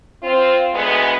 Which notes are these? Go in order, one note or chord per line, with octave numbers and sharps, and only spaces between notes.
C4 F4
D2 G#3 B3